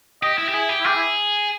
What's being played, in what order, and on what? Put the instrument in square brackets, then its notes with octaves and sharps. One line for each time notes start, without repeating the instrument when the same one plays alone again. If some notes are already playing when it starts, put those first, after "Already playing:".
[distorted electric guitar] G4 [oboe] D#5
[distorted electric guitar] E4
G4
[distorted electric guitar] E4 [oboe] G#4
[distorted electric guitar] G4
[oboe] E4
[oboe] G4 [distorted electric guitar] G#4
[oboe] E4